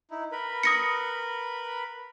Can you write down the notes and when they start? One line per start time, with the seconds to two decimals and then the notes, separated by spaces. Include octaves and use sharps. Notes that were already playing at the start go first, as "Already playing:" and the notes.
0.11 D#4 E4
0.32 A#4 B4 B5
0.63 D#6 A#6 C#7